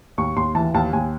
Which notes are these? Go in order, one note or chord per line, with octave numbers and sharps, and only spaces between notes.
D#2 C#6
D#2 C6
E3 A5
D#2 A5
D#2 G#5